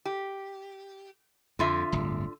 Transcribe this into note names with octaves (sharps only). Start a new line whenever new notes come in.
G4
F2 D3 F4 E5
D1 G1